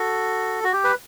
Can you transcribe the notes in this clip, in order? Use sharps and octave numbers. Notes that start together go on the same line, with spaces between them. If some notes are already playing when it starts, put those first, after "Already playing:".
Already playing: F#4 A4
F#4
G4
B4